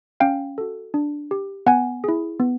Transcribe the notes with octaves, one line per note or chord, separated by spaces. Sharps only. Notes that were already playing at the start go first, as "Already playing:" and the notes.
C#4 F5 G5
F#4 A4
D4
G4
B3 F#5 G#5
E4 G#4
B3